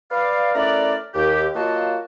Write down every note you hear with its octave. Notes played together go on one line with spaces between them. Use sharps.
B4 D5 F5
A3 C#4 E4 A#4 B4 D5
D#2 G4
F#3 A#3 F4 F#4 D#5 A5